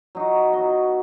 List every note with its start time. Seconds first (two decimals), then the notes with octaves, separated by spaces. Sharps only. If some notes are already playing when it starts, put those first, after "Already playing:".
0.15 F#3 D#4 F#4
0.53 F#3 B3 F#4 D#5